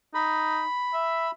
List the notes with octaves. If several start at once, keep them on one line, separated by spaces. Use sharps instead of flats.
D#4 B5
E5